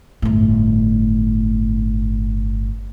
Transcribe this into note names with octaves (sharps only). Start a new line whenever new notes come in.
G1 A2